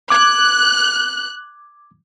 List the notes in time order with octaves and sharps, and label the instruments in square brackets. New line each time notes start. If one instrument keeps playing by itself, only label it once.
[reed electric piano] D6 G#6 [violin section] F#6